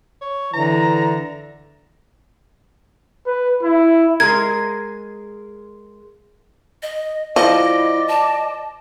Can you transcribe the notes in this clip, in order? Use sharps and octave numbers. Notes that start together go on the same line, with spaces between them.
C#5
D3 E3 A#5
B4
E4
G#3 G#4 A#4 G#6
D#5
F3 E4 D5 D#5
A5